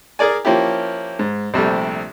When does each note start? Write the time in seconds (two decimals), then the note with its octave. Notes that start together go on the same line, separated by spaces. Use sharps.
0.19 G#4 A#4 D5 G#5
0.45 F3 A#3 C#4 E4 G4
1.19 G#2
1.54 A#1 C3 G3 A3